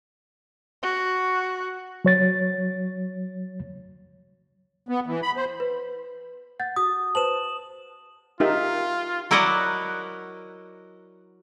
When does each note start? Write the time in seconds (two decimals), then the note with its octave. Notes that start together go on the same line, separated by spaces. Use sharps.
0.83 F#4
2.05 F#3 C#5 A6
4.89 B3
5.07 E3
5.23 B5
5.37 C5
5.60 B4
6.60 F#5 G6 A6
6.76 F#4 D#6
7.15 B4 C5 A5 E7 F#7
8.40 D#4 F4 G4 A#4 E5
9.31 F#3 E4 A#4 D5 D#5 F#5